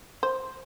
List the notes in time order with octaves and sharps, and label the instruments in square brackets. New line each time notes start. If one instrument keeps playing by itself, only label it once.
[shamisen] C5